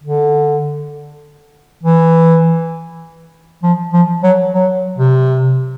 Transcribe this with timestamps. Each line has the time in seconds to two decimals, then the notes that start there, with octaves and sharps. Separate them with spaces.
0.03 D3
1.83 E3
3.63 F3
3.93 F3
4.23 F#3
4.53 F#3
4.98 C3